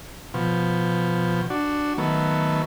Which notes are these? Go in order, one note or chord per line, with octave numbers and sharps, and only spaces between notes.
B2 F3
D4 F#4
D#3 F#3 A3 B3